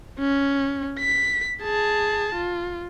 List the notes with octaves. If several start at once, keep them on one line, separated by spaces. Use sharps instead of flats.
C#4
B6
G#4 A5
F4